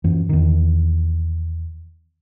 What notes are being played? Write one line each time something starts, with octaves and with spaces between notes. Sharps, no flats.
F#2 E3
E2 D#3